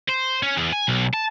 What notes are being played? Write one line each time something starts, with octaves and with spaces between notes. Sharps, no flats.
C5
C#4
E2
G#5
B1
A5